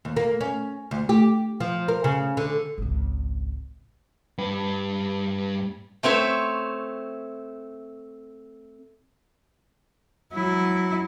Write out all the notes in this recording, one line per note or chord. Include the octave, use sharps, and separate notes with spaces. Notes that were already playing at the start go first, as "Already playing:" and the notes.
D#2
A#3
C#4
D2
G4
F3
A#4
C#3
D3
G#1 C#2
G2 B4
A3 C4 C#5 E5
F#3 E4